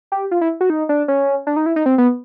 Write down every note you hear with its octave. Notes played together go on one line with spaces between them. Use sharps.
G4
F4
E4
F#4
D#4
D4
C#4
D4
D#4
E4
D#4
C4
B3